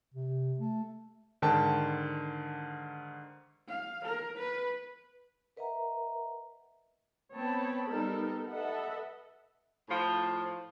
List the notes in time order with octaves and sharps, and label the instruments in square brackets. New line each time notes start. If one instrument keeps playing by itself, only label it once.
[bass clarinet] C3
A3
[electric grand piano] G#2 D3 D#3 G5 A5
[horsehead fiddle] F5
A#4
B4
[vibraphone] A#4 B4 D#5 E5 F#5 A#5
[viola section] B3 C4 C#5 G5 A5 B5
G3 B3 D#4 A4 A#4
A4 B4 D#5 E5 F#5
[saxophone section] A2 F3